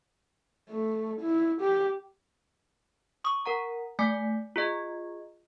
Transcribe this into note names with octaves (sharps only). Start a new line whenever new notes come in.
A3
E4
G4
C#6 D#6
A#4 F#5 A#5
A3 G#5 D6 G6 B6
F4 G#4 D#5